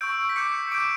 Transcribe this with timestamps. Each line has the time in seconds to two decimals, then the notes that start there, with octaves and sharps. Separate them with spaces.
0.01 C#6 E6 G6 D7
0.29 B6
0.36 D6 G6 C#7
0.71 D6 G6 D7